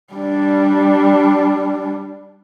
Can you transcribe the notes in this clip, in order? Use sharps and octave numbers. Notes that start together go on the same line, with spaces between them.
G3 D4